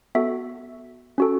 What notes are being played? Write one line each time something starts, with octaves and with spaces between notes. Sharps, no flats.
B3 F#4 A4 E5
C#4 F#4 A4